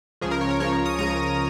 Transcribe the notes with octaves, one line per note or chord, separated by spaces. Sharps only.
C#2 C#3 F3 G#4
A#4
C#5
A#4
C#2 C#3 F3 C#5
C#5
D#6
C#2 C#3 F3 A#5